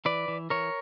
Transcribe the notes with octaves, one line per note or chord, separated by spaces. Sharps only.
E3 B4 D5
E3
E3 A#4 C#5